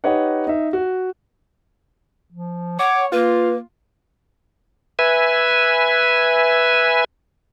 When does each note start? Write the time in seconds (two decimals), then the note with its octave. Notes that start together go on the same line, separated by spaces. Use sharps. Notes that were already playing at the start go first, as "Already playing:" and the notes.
0.04 D#4 G4 B4 C#5 D#5 F#5
0.47 D#4 E5
0.73 F#4
2.31 F3
2.79 C#5 F#5 D6
3.12 A#3 F4 B4
4.99 B4 E5 G#5